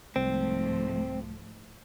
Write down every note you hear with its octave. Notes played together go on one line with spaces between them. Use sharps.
C2 G#2 F3 A3 C4